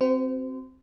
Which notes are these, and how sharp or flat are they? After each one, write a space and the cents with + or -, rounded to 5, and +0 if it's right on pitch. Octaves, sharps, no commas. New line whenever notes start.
C4 +0 F#4 +20 C5 -30